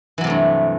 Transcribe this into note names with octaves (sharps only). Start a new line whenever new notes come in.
G2 C3 E3 F#3 A3